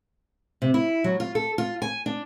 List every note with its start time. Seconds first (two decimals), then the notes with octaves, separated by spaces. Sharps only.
0.62 C3
0.74 E4
1.04 F#3
1.20 F4
1.35 A4
1.58 F4
1.82 G#5
2.06 D4